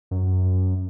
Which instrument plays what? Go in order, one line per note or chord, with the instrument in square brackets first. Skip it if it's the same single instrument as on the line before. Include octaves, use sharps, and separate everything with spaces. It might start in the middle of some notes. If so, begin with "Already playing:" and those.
[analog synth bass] F#2